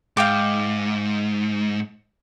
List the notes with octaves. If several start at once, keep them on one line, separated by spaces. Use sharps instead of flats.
G#2 F5 G5 D6